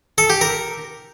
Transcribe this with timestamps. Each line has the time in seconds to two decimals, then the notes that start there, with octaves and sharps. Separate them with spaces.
0.18 A4
0.30 G4
0.41 A#4